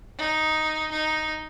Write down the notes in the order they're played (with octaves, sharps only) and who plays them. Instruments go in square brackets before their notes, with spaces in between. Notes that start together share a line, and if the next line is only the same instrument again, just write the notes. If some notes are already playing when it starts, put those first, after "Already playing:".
[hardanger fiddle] D#4
D#4